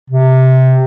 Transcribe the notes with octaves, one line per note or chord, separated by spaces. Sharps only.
C3